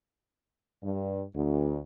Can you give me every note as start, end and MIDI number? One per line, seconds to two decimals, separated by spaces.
0.83 1.22 43
1.35 1.78 38